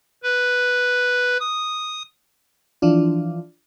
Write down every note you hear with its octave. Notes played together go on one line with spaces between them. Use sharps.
B4
D#6
E3 F3 D4 F4